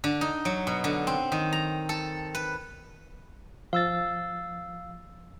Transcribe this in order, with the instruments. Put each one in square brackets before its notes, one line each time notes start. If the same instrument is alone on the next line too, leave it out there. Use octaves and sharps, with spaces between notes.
[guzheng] D3
D#4
F#3
B2
D3
C4
D#3
A#5
A4
B4
[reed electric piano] F3 A6 [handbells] F5 E6